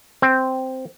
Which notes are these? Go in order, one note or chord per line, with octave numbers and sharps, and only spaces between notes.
C4